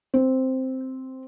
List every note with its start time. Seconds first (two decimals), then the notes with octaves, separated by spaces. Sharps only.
0.14 C4